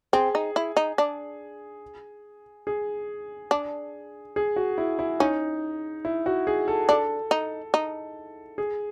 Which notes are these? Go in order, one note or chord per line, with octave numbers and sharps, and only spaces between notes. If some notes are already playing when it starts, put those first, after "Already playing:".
C4 G#4
D#4
E4
D#4
D4
G#4
D4
G#4
F#4
E4
E4
C#4 D#4
E4
F#4
G#4
A4
D4 A4
D#4
D#4
G#4